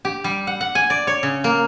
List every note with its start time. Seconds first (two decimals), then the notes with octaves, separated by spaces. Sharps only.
0.05 G4
0.24 G3
0.47 F#5
0.61 F#5
0.75 G#5
0.90 D5
1.07 C#5
1.23 C#3
1.44 A#3